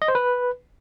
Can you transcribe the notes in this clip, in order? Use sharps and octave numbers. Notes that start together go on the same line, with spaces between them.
D#5
C5
B4